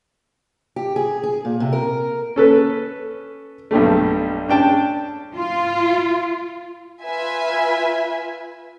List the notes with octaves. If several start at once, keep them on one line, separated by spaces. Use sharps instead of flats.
G4
G#4
G#4
A#2
C3
A#4
C#4 A4 B4
B1 G2 G3 A3
C#4 D4 G5 A5
F4
F4 B4 E5 G#5